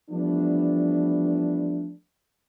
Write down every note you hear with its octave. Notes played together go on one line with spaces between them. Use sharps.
E3 F3 G3 A3 B3 D4